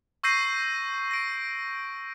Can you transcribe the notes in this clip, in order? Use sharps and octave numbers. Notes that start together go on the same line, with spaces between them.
C#6 E6 G6 A#6 C7 D#7
A#6 D7